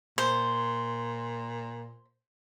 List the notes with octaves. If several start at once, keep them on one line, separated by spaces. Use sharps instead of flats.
A#2 C5